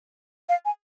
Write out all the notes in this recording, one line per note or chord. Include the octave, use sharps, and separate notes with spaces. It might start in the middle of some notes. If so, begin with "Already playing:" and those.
F5
G#5